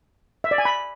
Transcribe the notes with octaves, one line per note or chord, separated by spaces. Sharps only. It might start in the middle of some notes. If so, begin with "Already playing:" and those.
E5
D5
G#5
B5